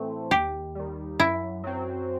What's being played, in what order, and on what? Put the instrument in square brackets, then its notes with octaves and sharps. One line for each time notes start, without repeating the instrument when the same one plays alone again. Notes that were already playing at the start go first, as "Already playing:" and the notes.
Already playing: [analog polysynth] A2 E3 A3 C4
[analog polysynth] D#2 [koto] G4
[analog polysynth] D#3 G3
[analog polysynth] F#2 [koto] E4
[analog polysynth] F#3 C4